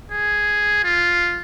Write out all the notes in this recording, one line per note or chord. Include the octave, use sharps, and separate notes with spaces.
G#4
F4